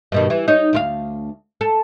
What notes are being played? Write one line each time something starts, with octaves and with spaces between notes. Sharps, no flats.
G2 B2 D#3
E3
D#4 C#5
D2 F4 F5
A4